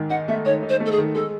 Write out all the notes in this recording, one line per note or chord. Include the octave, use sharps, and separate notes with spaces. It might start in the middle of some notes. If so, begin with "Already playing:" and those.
Already playing: G#2 D#3
D#4 F#5
A3 E5
D#3 C#5
D#4
C5
A3
A4
G#4
D#3
G#3 A4